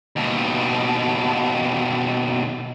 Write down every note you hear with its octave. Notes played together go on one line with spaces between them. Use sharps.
D#2 B2